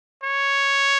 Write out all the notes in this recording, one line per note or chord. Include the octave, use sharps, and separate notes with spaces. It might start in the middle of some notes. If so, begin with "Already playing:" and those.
C#5